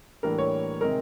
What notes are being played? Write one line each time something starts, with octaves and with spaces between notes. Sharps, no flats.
A2 E3 G3 A#3 D4 A#4
C#5
C3 D#3 G#3 C4 A#4